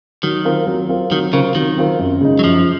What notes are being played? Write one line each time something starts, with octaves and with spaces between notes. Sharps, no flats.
D#3 F#3
C4 F4 A#4
F#3
C4 F4 A#4
D#3 F#3
C#3 C4 F4 A#4
D#3 F#3
C4 F4 A#4
F#2
C#3 G#3 D#4
F#3
F#2 F3